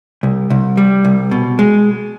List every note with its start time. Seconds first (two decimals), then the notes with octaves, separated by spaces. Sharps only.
0.23 C2
0.50 C2
0.77 G3
1.05 C2
1.31 B2
1.59 G#3